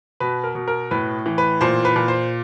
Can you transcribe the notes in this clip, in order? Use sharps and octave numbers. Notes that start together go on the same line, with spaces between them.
B2 B4
A#4
B2
A#4
A2 B4
E3
B4
A#2 C5
B4
A#2
C5